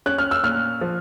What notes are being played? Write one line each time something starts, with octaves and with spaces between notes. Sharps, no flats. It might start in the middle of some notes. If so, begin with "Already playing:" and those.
C#4 F#6
F6
E6
A#2 F6
F3